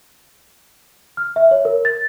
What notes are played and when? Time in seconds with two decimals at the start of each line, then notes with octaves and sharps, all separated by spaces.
1.17 F6
1.36 E5
1.51 C#5
1.65 A#4
1.85 A6